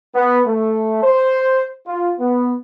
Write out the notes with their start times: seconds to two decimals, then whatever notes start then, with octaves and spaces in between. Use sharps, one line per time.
0.14 B3
0.47 A3
1.03 C5
1.86 F4
2.19 B3